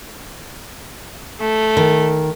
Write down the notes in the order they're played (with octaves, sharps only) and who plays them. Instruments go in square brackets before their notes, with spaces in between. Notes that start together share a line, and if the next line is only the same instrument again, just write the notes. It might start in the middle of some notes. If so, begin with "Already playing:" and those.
[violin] A3
[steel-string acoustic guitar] D#3